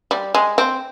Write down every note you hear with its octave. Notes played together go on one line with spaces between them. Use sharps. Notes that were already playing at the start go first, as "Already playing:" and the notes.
G3
G#3
C4